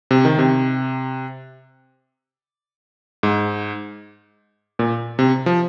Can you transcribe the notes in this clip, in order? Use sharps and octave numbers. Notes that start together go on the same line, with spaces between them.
C3
D#3
C3
G#2
A#2
C3
F3